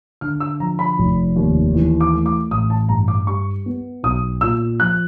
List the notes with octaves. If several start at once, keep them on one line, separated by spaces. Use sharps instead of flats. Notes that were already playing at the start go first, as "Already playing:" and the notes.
D3 F6
E6
F3 A#5
B5
F1
D#2
E3
D6
A3
D6
A1 D#6
A5
G2 A#5
D6
G3 C#6
B3
B1 D#6
A#2 E6
F3 F#6